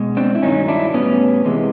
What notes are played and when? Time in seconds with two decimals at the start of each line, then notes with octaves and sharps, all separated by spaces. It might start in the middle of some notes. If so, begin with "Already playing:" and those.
Already playing: B2 G#3
0.17 C4 D4
0.35 E4
0.42 G2 D#3 F#3 C#4 D#4
0.68 D4 E4
0.94 A2 E3 G3 B3 C#4
1.45 E2 C3 E3 G#3